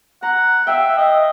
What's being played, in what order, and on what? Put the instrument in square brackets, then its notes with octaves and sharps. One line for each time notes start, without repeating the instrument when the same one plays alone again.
[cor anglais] F#5 [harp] A#5
[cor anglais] E5 [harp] F5 G5
[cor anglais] D#5